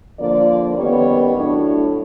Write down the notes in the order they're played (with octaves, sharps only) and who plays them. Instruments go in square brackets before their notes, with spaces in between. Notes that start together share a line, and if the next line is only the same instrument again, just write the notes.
[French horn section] D3 F3 A#3 D5
F#2 D#3 G3 B3 C#5
A2 F#3 A3 D4